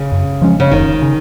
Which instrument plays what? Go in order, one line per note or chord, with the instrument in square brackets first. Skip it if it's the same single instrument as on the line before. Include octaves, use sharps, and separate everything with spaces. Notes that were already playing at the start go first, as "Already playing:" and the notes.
Already playing: [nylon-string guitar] C#3
[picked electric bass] F#2
F3 G#3 C#4
[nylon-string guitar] C#3
[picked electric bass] F1 [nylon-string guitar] D#3
[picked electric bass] C#3